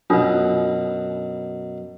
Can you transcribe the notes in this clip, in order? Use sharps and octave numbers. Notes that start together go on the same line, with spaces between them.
F#2 B2 D4 F4 D#6